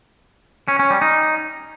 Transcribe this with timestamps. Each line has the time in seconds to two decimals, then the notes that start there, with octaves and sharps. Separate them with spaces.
0.68 C#4
0.79 C#4
0.90 G3
1.02 D#4